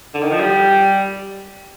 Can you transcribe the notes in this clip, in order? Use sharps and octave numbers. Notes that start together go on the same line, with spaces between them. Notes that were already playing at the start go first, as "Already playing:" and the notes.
D3
D#3
F3
G3